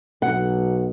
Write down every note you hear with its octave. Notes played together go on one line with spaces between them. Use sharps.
B1 F#5